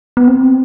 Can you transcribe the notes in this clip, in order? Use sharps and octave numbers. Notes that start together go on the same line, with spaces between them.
B3
C4